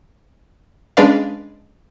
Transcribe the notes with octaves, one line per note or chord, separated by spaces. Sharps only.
G#3 C#4 D4 B4 D5 F5